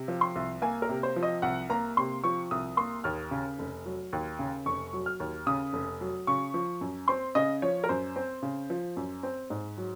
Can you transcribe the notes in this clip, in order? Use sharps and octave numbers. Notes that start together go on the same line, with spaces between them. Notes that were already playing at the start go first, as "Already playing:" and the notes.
Already playing: C3
F3
C6
C2
A#3 G#5
A#4
C3
C5
F3
D#5
C2 F#5
A#3 A#5
C3 C6
F3 C#6
C2 D#6
A#3 C6
D#2 F6
C#3
F1
F#3
D#2
C#3
F1 C#6
F#3
F6
D#2
C#3 D#6
F1
F#3
C#3 C#6
F3
F#2
C4 C6
C#3 D#5
F3 C#5
A#4
F#2 C5
C4
C#3
F3
F#2
C4
G#2
F#3